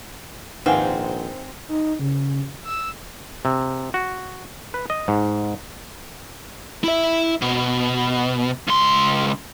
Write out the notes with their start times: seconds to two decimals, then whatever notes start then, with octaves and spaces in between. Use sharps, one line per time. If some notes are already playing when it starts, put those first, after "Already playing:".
0.66 A#1 G#2 D#3 C4 B4 F5 F#5 G#5
1.68 D#4
1.99 C#3
2.64 E6
3.45 C3
3.94 F#4
4.74 B4
4.90 D#5
5.08 G#2
6.84 E4 E5
7.42 B2
8.68 C#2 C6